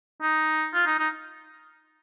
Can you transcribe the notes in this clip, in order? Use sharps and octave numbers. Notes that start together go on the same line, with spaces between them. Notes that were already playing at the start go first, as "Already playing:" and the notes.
D#4
F4
D#4
D#4